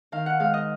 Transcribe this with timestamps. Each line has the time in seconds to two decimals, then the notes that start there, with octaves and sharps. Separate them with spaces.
0.12 D#3 F5
0.26 F#5
0.40 G#2 F5
0.54 D#5